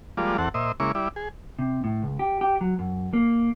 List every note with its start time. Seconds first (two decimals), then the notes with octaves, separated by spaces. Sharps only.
0.17 F3 G3 G#3 A#3 F4 D5
0.38 E2 C4 A4 F#5
0.54 A#2 C5 D#5 E5
0.80 C#3 G#3 A#3 E4 C#6 D6
0.95 G3 E4 D5
1.16 G#4
1.59 C3
1.84 A2
2.03 C#2
2.19 G4
2.41 G4
2.61 F#3
2.79 F#2
3.13 A#3